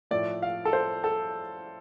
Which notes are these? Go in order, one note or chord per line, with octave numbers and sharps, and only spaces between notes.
A2 F3 A3 D5
F5
A4
C5
A4